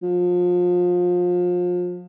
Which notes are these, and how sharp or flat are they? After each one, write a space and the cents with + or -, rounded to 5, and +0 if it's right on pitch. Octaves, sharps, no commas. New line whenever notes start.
F3 +30